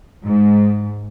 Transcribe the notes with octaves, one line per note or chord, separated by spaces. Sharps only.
G#2